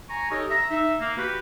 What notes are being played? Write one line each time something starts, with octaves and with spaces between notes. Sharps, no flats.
G#5 A#5 C#6
D#4 G4 A4 A#4 C#5 D#5
E5 A#5
D#4 E5
A#3
F#4 G4 B4